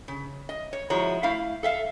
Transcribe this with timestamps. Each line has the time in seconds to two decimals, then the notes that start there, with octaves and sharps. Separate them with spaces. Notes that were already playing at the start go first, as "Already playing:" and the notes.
0.08 C#3
0.49 D#5
0.73 C#5
0.90 F3 G#3 E4 F#4 C#5 A#5
1.23 A3 E4 F5
1.63 A4 E5 F5